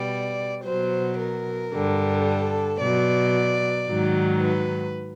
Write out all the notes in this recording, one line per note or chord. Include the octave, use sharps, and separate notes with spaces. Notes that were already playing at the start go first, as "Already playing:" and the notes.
Already playing: B2 G3 D5
B2 F#3 C5
A#4
G2 D3 G3
A4
B2 F#3 D5
G#2 D#3 F#3
B4